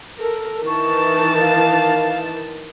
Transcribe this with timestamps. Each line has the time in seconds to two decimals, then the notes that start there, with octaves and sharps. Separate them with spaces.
0.19 A4 A#4
0.66 D#3 E3 A5 C#6
1.40 F5